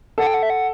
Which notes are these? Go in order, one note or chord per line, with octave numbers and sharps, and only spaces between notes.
A4 F#5
G5
F#5
E5
F#5